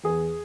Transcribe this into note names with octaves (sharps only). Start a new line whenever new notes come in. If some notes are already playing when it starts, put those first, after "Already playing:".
E2 G#4